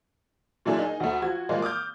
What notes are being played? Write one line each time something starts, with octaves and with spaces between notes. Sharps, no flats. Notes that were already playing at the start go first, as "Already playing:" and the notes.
A#2 F#3 A3 D4 E4 G#4
D#4 G#4
D2 A3
F3 F#4 G#6
A#2 F3 G3 G#3 A#3
D6 D#6 F6 G6